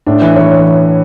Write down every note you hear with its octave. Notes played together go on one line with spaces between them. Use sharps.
A2 D4
E3 B4
E3 C#5